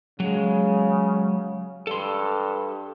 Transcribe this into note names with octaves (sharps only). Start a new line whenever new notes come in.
C#3 F#3 G#3
G2 A4 C6